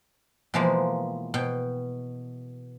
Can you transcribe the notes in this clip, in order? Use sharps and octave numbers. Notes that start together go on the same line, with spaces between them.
B2 E3 F3 G#3 A#3
B2 G5